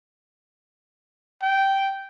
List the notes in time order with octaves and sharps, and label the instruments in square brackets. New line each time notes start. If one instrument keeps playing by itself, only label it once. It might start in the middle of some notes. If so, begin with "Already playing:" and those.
[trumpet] G5